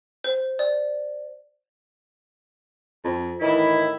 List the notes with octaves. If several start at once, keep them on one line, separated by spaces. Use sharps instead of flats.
C5
D5
F2
A2 D#3 E3 E4